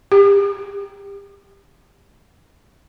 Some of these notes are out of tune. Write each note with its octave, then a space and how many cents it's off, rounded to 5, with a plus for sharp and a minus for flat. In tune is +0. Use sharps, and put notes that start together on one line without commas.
G4 +30